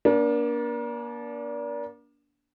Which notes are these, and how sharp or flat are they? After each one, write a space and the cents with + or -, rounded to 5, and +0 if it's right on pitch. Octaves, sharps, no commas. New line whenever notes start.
A#3 +35 D4 -25